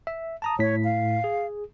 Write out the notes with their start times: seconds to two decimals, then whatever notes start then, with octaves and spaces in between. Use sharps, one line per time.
0.07 E5
0.42 A5 A#5 D#6
0.59 A2 C#5 B6
0.84 F5
1.24 G#4